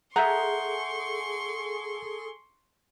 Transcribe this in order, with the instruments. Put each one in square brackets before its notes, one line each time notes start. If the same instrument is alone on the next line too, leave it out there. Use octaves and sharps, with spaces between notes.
[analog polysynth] G#4 A4 [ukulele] E5 A#5 [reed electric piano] F#5 G6 [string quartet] C6 C#6